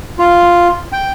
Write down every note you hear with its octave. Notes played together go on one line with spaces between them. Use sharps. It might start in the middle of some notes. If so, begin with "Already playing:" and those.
F4
G5